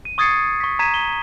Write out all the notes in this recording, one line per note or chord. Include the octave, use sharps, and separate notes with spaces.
D#7
C#6 D#6 G#6 A6 C7 C#7
C#6 B6
A#5 G#6 B6 D#7 E7
G7